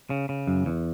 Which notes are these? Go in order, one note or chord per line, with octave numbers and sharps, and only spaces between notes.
C#3
C#3
F#2
E2